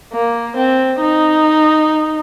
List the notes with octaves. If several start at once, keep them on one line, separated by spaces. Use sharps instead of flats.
A#3
C4
D#4